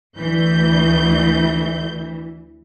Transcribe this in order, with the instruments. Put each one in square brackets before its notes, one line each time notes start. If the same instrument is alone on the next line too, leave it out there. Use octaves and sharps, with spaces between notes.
[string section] D2 G6 [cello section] E3